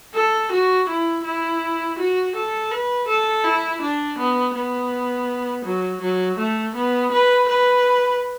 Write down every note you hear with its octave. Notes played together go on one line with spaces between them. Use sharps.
A4
F#4
E4
E4
F#4
A4
B4
A4
E4
D4
B3
B3
F#3
F#3
A3
B3
B4
B4